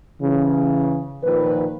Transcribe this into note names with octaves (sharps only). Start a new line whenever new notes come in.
C#3 E3
A#2 D#3 F3 B4